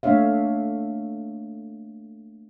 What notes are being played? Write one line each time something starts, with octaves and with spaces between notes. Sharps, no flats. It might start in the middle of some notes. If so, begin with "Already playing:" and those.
A3 A#3 D4 C#5 E5 F5